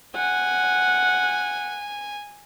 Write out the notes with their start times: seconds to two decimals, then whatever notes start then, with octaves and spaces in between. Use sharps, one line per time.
0.16 F#5 G#5